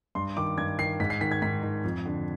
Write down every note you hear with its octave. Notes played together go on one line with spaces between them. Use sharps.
G2 C6
D#3 D6
G2 G#6
D#3 C7
G#2 B6
C7
D#3 B6
G#6
G#2 B6
D#3
F2
D3